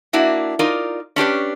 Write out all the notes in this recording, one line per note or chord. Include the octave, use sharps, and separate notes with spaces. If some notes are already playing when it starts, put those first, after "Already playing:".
A#3 D4 E4 F#4
D#4 F4 A#4 D5
C#4 D4 G4 B4